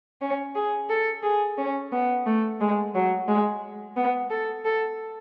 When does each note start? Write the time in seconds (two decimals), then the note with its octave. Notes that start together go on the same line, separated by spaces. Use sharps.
0.22 C#4
0.55 G#4
0.90 A4
1.23 G#4
1.57 C#4
1.92 B3
2.26 A3
2.61 G#3
2.95 F#3
3.28 G#3
3.97 B3
4.30 A4
4.65 A4